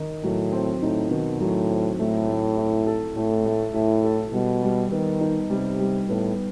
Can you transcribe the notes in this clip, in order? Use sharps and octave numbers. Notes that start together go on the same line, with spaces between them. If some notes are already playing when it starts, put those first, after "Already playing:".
Already playing: D#3 D#4
A2 F#3
C4
A2 D#4
B2 D#3
A2 F#3
C4
A2 A3
A3
E4
A4
A2 A3
A3
A2 E4
A4
B2 G3
G3
D#3 B3
D#4
C3 G3
G3
A2 B3